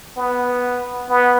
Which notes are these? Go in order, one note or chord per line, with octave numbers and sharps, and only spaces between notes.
B3
B3